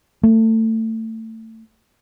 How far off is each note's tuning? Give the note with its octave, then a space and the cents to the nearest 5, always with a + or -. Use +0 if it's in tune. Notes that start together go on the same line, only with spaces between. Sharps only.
A3 +25